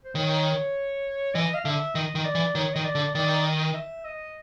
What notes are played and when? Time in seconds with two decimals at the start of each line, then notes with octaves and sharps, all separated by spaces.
0.05 C5
0.15 D#3 C#5
1.34 E3 D#5
1.54 F5
1.65 D3 E5
1.95 D#3 D#5
2.15 D#3
2.25 D5
2.35 E3
2.55 D#3 C#5
2.74 D#3 D#5
2.85 D5
2.95 D3
3.14 D#3 D5
3.45 D#5
3.74 E5
4.05 D#5